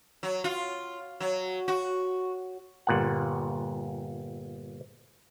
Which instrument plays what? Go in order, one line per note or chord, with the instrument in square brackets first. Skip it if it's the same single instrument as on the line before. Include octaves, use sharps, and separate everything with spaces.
[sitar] F#3
F4
F#3
F#4
[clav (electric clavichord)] G1 A#2 F#5